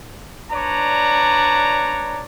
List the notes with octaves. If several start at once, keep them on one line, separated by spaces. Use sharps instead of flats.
D4 B4 C#5 D5 A#5